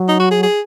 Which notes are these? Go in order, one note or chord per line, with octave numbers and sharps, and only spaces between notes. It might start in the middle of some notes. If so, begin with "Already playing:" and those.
Already playing: F#3
D#4
F#4
G#4
G#4